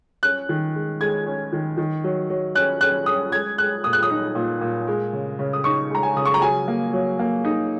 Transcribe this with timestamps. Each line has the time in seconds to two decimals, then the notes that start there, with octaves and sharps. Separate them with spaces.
0.23 C#4 F#6
0.49 D#3
0.75 G#3
1.01 G#3 G#6
1.26 C#4
1.53 D#3
1.78 D#3
2.04 F#3
2.30 F#3
2.55 C#4 F#6
2.81 C#4 F#6
3.06 C#4 D#6
3.32 G#3 G#6
3.58 G#3 F#6
3.84 A#2 D#6
3.93 F#6
4.03 D#6
4.10 D#4
4.35 A#2
4.61 A#2
4.87 G#3
5.13 C#3
5.39 C#3
5.53 D#6
5.64 D#4 C#6
5.90 G#3 A#5
6.03 G#5
6.16 C#3 D#6
6.25 C#6
6.34 A#5
6.42 F#3 G#5
6.68 A#3
6.93 F#3
7.19 A#3
7.45 D#4